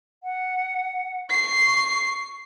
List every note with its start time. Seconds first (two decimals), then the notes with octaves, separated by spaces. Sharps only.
0.23 F#5
1.30 C#6 C7